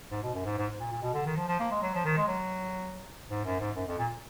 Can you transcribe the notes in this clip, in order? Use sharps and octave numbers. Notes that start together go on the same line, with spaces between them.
G#2
B2
F#2
G#2
G#2
A#2
A#2
B2
D3
D#3
F3
F3
A#3
G#3
F#3
F3
D#3
G#3
F#3
G#2
F#2
G#2
F#2
F2
A#2